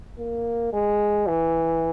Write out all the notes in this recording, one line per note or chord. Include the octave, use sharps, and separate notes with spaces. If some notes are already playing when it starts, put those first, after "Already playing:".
A#3
G#3
E3